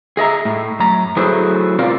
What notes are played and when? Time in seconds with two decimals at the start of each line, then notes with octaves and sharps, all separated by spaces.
0.17 G#4 D#5 E5 A#5
0.45 A2
0.80 F#2 A#5
1.17 F#3 A3 E4 G#4 B4 C5
1.79 B2 C4 F4 A#4 D5 F5